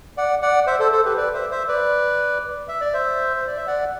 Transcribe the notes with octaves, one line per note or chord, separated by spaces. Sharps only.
D5 F#5
D5 F#5
C5 E5
A4 C5
A4 C5
G4 B4
B4 D5
C5 E5
C5 E5
B4 D5
E5
D5
C5 E5
C5
D5
E5
D5 F#5